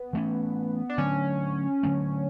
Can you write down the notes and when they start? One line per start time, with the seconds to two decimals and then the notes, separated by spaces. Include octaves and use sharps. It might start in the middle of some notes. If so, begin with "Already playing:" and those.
Already playing: B3
0.13 E3 A3 C#4
0.90 D4
0.98 D3 F#3 A3 C#4
1.83 D3 F#3 A3